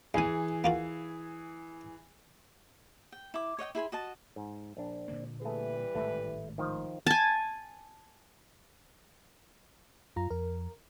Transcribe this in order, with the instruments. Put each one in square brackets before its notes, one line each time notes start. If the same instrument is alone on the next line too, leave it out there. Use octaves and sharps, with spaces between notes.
[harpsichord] E2 G#5 [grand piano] E3 G#4
[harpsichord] A#3 F4 F#4
[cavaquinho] G5
E4 D6
C#5 D#5 F#5 G5
E4 G#4 B5 C6
F#4 D#5 A5
[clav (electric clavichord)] G#2
A#1 D4
[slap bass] A#2 D3 A#3
[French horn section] E3 G3 B4 [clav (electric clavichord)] A3 G#4
[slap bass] G#1 A2 G#3 [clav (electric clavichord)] A3 E4
[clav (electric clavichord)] D#3 F3
[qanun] G#5 A5
[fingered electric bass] F#2 [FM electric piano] F4 A#5
[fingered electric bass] F2 [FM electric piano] A#4